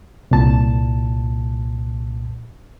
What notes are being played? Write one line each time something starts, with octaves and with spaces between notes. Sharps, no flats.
C2 A#2 A5